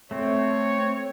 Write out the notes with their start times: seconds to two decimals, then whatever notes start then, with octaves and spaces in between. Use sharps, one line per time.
0.11 A3 C4 C#5